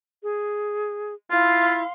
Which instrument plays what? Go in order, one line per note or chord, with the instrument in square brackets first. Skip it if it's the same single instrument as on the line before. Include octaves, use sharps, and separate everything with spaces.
[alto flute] G#4
[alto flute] E4 [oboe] F4 [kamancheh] F5 C6